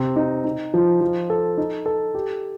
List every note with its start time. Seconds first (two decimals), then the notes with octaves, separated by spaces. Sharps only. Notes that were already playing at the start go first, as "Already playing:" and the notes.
Already playing: C3 C4
0.16 D#4
0.44 D#4
0.74 F3
1.01 F3
1.30 A4
1.57 D#4
1.86 A4
2.15 G4